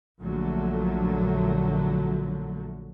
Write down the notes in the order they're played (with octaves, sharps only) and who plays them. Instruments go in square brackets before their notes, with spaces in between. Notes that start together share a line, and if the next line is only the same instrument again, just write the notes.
[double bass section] A#1 A#2 D3 F#3 A3